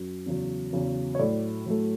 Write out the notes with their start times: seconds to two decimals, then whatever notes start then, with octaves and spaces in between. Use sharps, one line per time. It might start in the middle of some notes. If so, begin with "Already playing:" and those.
Already playing: F#2 F#3
0.26 E2 C#3 F#3
0.73 E2 C#3 F#3
1.15 C#5
1.19 A2 F#3 A3 D5
1.66 A2 F#3 A3